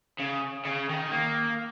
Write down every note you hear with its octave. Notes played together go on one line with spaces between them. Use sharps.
C#3
C#3
D#3
A#3